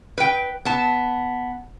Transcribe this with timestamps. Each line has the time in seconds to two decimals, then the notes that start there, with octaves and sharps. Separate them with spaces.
0.18 B4 G5
0.65 B3 A5